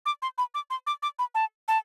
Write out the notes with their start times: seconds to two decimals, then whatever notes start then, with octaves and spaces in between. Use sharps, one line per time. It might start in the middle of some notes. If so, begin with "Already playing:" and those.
0.06 D6
0.22 C6
0.38 B5
0.55 D6
0.70 C6
0.87 D6
1.03 D6
1.19 B5
1.35 A5
1.68 A5